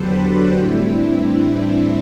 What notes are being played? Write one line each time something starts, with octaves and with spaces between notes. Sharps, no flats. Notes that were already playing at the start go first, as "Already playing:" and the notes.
Already playing: E2 D3 F#3 G4 A4 B4 C5
D4 F#4
A2 E3 G3 C4 E4
D4
C4
D4